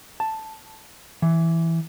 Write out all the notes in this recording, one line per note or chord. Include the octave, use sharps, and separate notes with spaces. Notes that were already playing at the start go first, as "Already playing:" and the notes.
A5
E3